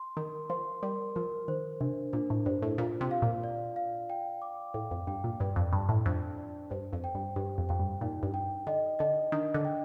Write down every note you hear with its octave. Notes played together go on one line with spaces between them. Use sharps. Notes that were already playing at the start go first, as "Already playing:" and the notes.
Already playing: C6
D#3 A#4
F3 C6
G3 A#4
F3 A#4
D#3 C5
C3 D4
A#2 D4
A2
G2 C5
A2
A#2 F4
C3
F5
A#2
D5
F5
G5
D6
A2 G5
F2
G2 G5
A#2
G2 D5
F2
G2 A5
A2
F2 D4
D5
G2 C5
F2
G5
G2
G2 G4
F2
F2 G5
G2
A#2 D#4
G2
G5
D3 D#5
D3 D#5
D#3 D4
D3
G5